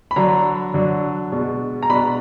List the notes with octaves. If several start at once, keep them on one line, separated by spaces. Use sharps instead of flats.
B5
D3 F#3 D4 A#5
D3 F#3 D4
B2 G#3 D4
A#5
B2 G#3 D4 B5